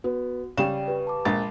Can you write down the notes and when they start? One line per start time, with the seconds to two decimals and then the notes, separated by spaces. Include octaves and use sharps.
0.04 B3 F#4
0.58 C#3 G3 D5 G5 E7
0.88 G4 B4
1.07 A5 B5 D6
1.25 A#1 G#3 A6